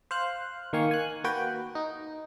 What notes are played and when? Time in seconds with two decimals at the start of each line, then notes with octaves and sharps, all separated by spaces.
0.11 C5 F5 F#6
0.73 D#3 A#3 F5 G#5 C#6
0.91 G#5 F#6
1.24 A#3 F#4 B4 G5
1.75 D#4